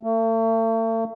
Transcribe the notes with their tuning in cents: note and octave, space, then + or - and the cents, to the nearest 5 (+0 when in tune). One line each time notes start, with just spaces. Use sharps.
A3 +40